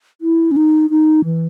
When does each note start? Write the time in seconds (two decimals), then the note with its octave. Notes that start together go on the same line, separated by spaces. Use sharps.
0.21 E4
0.51 C#4
0.56 D#4
0.90 D#4
1.25 E3